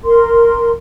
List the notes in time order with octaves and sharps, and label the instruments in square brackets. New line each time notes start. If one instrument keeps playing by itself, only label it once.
[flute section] A#4 C6